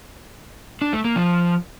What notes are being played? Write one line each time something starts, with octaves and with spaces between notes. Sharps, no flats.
D4
A3
A#3
F3